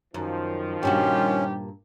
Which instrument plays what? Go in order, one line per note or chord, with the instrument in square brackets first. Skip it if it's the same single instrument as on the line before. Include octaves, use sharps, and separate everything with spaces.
[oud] F#2 [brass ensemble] D#3 F3
[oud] G2 A#2 F#4 [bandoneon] C#4 [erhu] G4